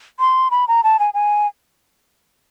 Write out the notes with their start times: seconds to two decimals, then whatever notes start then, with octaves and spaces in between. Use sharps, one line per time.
0.20 C6
0.51 B5
0.68 A#5
0.84 A5
0.99 G#5
1.14 G#5